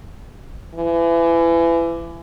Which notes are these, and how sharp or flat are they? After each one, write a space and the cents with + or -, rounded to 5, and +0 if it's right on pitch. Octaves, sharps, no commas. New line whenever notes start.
E3 +30